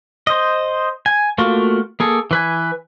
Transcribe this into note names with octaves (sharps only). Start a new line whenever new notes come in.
C5 D#5
G#5
A3 A#3 F4 F#4
A#3 G#4 A4
E3 B4 G#5